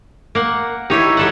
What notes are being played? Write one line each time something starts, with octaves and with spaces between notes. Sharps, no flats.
A#3 F#5
D#4 E4 G4 C#5
F#3 G3 A4 F#5